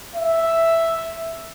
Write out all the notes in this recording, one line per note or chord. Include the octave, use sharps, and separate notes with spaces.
E5